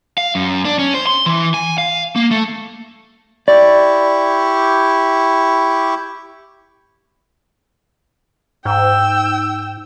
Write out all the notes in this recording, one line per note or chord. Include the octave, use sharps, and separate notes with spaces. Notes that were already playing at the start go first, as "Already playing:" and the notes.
F5
F#2
D4
C#4
C5
C6
E3
G#5
F5
A#3
A3
E4 G4 D5 C#6
G#2 G5 E6